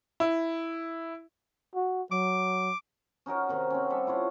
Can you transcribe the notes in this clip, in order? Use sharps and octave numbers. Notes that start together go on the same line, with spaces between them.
E4
F#4
F#3 D6
C#4 D#4 F#4 A#4
C3 D#3
C4 C#4
G3 A4 E5
E4 F4 C#5 F#5